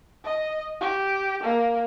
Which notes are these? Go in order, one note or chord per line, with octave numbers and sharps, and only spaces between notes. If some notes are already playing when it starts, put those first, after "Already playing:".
D#5
G4
A#3